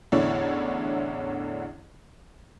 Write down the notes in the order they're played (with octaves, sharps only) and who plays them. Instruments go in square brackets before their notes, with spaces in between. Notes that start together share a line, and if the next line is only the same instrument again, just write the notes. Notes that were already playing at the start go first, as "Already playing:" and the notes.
[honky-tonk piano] A1 E2 D3 E4 C#5 D5